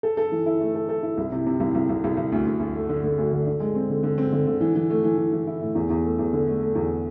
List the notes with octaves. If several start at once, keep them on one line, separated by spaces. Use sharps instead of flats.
A4
A4
E3
E4
A3
A4
A4
E4
C2
C3
C3
C2
C2
C2
C2
C2
D2
D2
D2
A3
D3
D3
D2
D3
D3
G#3
C4
D3
D3
C4
D3
D3
E3
E3
A3
E3
E3
E3
E4
A2
E2
E2
A3
E2
D3
A3
A3
E2